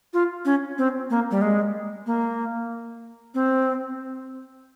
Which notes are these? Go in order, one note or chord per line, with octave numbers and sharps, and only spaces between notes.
F4
C#4
C4
A#3
G3
G#3
A#3
C4